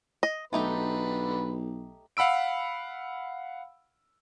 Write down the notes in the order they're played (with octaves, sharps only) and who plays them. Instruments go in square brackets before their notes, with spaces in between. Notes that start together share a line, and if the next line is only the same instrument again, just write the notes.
[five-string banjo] D#5
[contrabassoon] B1 [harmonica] D3 B4 [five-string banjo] A3 D#4 G4
[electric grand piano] F5 F#5 B5 E6 D7